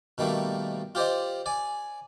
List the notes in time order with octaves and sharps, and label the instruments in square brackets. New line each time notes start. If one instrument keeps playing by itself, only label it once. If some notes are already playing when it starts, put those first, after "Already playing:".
[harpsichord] B2 D#3 G3 A3 A#3
F4 G4 C5 D5 D#5
D5 G#5